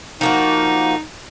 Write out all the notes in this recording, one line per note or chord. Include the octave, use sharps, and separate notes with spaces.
F3 A#3 D#4 F#4